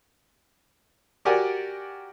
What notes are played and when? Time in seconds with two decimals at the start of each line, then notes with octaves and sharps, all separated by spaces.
1.25 F#4 G4 A#4 D5 F#5 G#5